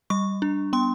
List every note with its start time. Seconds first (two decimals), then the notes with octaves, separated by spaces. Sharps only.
0.10 G3 C#6
0.42 D4
0.73 B3 C6